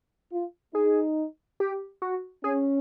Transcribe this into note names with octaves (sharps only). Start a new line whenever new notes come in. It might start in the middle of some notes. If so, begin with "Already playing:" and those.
F4
D#4 G#4
G4
F#4
C#4 G#4